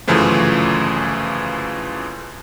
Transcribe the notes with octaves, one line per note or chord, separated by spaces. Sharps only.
G1 F#2 C#3 E3 F3 A3